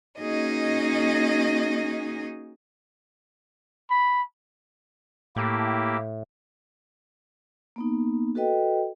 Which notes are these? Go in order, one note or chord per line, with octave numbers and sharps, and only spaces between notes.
A#3 C#4 D#4 F#4 G#4 D#5
B5
A2 A#3 E4 G4
A#3 B3 D#4
F#4 A4 B4 D#5 G5